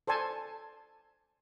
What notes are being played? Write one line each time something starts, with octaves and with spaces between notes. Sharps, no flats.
A4 C5 D5 G#5 A5